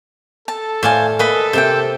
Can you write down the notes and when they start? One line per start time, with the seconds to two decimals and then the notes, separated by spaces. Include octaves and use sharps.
0.48 A4 A5
0.83 A2 C5 D5 F5 G#5 A5
1.19 A#3 A4 B4 D#5 B5
1.53 C3 A#3 C5 G5